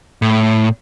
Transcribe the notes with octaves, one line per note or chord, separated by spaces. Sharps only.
A2